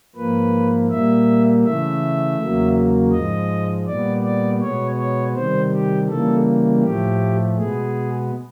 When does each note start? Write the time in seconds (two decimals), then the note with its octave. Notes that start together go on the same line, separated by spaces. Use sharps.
0.16 G#2 F3 A#3 B4
0.90 A#2 G3 A#3 E5
1.64 C#3 E3 A3 E5
2.38 E2 C#3 F#3 A#3
3.12 G#2 F3 G#3 D#5
3.87 A#2 G3 B3 D5
4.23 D5
4.60 B2 G#3 B3 C#5
4.98 C#5
5.35 C3 D#3 G3 C5
5.72 G4
6.09 C#3 E3 G3 A#3 A4
6.83 A2 F3 A3 G4
7.57 B2 G#3 B3 G#4